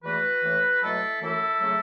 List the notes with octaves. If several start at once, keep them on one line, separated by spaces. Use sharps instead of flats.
E2 E3 A3 F#4 B4
A2 E3 A3
B2 F#3 A3 E4 A4
F#2 E3 A3 E4 A4
C#3 F#3 A3